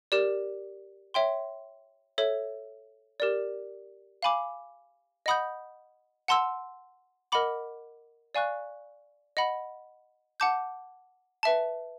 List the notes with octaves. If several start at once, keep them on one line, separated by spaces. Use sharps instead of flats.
G4 A#4 D5
C#5 E5 G5 C6
A4 C#5 E5
G4 A#4 D5
F5 G#5 B5 D6
D#5 F#5 B5 D#6 G6
F#5 A5 C6 E6
A#4 D#5 F#5 B5 D6
D5 F5 G#5 C#6 F#6
D#5 F#5 B5
F#5 A5 D6 G6
B4 E5 A5